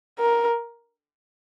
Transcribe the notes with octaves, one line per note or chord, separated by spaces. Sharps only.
A#4